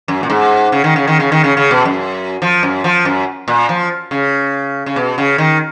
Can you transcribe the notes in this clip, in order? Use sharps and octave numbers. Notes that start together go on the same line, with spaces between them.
F#2
A#2
G#2
C#3
D#3
C#3
D#3
C#3
D#3
C#3
C#3
B2
F#2
F3
F#2
F3
F#2
A#2
F3
C#3
C#3
B2
C#3
D#3